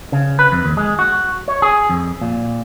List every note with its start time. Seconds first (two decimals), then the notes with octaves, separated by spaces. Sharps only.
0.12 C#3
0.39 B4
0.52 F2
0.65 D#2
0.77 G#3
0.99 F#4
1.48 C#5
1.62 G#4
1.89 F2
2.21 A#2